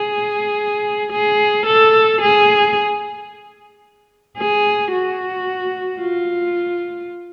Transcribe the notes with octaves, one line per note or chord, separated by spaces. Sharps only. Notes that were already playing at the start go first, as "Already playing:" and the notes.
Already playing: G#4
G#4
A4
G#4
G#4
F#4
F4